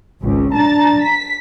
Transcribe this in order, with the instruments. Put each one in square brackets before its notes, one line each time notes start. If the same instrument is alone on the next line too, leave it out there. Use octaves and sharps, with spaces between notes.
[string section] G#1 C#2
[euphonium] D4 [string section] A5 A#5 A6
[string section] B6